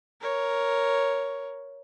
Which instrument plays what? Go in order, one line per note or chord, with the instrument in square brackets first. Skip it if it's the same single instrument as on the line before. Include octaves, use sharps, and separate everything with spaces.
[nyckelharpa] A#4 C#5